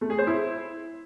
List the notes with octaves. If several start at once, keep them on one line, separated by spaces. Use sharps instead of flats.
A3
G#4
C5
E4